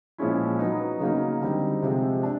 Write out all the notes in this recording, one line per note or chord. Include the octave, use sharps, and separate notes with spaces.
A#2 F3 G#3 C#4 E4
F#3 B3 D#4
C#3 F#3 A#3 D#4
D3 G3 C4 D#4
C3 F3 G#3 C4
D4